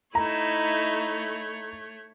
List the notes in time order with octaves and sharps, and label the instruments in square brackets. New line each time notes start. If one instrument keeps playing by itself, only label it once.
[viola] A3 C#5 [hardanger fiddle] D#4 E4 [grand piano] A#5